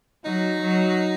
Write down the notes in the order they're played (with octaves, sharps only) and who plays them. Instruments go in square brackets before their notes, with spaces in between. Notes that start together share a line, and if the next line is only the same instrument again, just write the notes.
[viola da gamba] F#3 [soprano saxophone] D#4
[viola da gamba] F#3